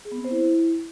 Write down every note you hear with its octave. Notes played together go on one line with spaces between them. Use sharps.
G#4
B3
C4
C5
E4